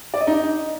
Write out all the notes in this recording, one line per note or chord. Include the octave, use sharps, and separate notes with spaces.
D5
D#5
D#4